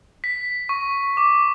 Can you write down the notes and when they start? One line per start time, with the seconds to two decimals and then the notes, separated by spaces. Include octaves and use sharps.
0.24 B6
0.69 C#6
1.17 D6